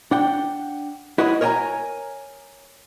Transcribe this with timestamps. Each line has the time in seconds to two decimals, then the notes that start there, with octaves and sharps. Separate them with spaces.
0.11 D4 F#5 G5
1.18 E4 F#4 B4 C#5 D#5 F#5
1.41 A#4 C#5 D#5 G5 G#5 A#5